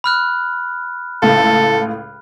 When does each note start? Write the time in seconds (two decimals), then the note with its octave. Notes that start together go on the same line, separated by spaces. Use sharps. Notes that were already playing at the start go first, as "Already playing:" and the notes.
0.04 B5 F6 F#6
1.22 C#2 A2 A4